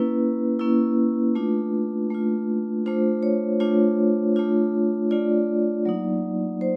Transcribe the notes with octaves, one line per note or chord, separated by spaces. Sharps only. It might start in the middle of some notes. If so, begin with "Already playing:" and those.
Already playing: A#3 C#4 E4 B4
A#3 C#4 E4
A3 D4 F4
A3 D4 F4
A3 D4 F4 C5
C#5
A3 D4 F4 C#5
A3 D4 F4
A3 D4 F4 D5
F#3 A#3 D#4
C5